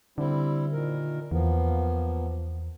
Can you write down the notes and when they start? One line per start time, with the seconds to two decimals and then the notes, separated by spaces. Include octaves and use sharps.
0.18 D3 G3 C4 E4
0.72 A#2 D#3 A#4
1.31 E2 F3 A#3 B3